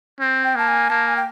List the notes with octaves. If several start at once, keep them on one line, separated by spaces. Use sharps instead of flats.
C4
G5
A#3 A5
G#5
A#3 A5
G#5
G5